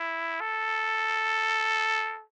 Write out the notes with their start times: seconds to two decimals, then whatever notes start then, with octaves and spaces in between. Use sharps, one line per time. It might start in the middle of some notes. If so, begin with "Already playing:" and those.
Already playing: E4
0.41 A4